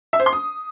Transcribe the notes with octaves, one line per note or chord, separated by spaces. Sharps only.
E5
C5
C6
D#6